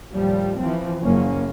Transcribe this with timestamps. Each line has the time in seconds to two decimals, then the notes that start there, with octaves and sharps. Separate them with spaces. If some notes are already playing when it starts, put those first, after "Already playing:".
0.13 D#2 A2 F3 G3
0.60 E3 F3 C4
1.02 F#1 F#2 A#3 C#4